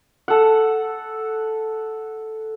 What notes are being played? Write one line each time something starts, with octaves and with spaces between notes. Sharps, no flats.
A4 F#5